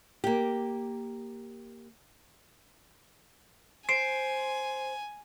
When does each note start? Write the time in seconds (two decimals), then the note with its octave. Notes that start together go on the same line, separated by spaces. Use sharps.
0.24 A#3 G4
3.89 C5 G#5 C7 D7